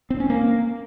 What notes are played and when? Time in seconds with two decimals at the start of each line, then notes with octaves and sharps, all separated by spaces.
0.10 C4
0.20 C#4
0.30 A#3